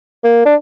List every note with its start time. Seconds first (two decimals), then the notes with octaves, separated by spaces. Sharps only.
0.24 A#3
0.45 D4